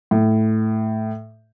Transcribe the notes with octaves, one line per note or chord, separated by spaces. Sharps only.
A2